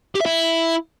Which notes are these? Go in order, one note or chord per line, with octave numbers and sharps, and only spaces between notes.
G4
E5
E4